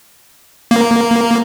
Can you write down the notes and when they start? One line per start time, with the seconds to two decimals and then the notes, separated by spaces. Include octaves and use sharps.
0.71 A#3